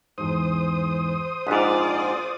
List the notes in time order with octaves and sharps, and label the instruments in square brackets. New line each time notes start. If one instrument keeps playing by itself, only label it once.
[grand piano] E2 G#2 [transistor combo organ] C5 D#6
[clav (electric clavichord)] A#1 G#2 [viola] F4 D5 [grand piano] F#6 B6